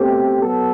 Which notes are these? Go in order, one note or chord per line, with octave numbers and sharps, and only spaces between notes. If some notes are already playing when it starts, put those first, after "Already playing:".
Already playing: B2 A3 C4 G4
B2 F#3 B3 A4